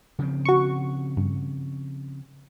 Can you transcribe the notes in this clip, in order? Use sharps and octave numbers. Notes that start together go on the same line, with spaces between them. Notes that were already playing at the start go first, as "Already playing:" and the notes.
C#3 F3 C4
F#4 C#6
G2